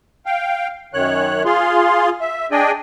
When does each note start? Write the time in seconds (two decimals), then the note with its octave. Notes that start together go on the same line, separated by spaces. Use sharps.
0.26 F5 G5
0.94 F#2 D#3 C#5 F#6
1.45 F4 G#4 F5 C6
2.21 E5
2.51 D4 G#4 D5 D#5 G5 G#5